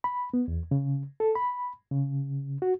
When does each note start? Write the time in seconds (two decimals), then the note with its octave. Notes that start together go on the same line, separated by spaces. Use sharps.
0.04 B5
0.34 B3
0.48 E2
0.71 C#3
1.20 A4
1.35 B5
1.91 C#3
2.62 F#4